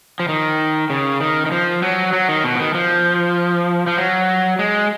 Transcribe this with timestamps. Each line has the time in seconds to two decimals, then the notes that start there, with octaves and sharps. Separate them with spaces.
0.20 F3
0.29 D#3
0.90 C#3
1.20 D#3
1.46 D#3
1.52 F3
1.82 F#3
2.13 F#3
2.29 D#3
2.44 B2
2.55 F3
2.59 D#3
2.74 F3
3.87 F3
3.98 F#3
4.59 G#3